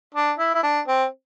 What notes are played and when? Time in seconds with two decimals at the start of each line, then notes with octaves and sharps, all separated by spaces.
0.14 D4
0.39 E4
0.54 E4
0.63 D4
0.87 C4